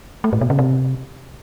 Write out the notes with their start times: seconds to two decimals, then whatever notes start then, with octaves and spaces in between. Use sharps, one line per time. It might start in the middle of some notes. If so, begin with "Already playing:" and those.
0.24 A3
0.33 A2
0.41 B2
0.50 C#3
0.59 C3